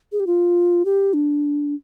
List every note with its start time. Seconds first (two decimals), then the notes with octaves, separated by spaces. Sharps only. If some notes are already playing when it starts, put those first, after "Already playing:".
0.12 G#4
0.20 G4
0.27 F4
0.85 G4
1.14 D4